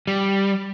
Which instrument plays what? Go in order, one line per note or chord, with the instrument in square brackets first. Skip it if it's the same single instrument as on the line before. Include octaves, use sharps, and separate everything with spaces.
[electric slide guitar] G3